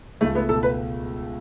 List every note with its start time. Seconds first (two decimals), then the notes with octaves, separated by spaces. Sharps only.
0.21 C#2 A3
0.35 A3 B3
0.49 B2 A4
0.63 B4